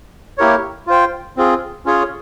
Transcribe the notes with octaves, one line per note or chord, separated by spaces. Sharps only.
A#3 E4 G4 A#4 C#5
F4 C5 G5
C4 F4 G#4
C#4 F4 G#4 C#5